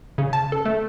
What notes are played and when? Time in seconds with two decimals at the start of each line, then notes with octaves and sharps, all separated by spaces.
0.18 C#3
0.33 A5
0.52 A4
0.65 A3